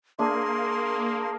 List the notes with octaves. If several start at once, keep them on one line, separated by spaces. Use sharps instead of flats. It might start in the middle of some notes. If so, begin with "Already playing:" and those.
A#3 D4 G#4 E5 C6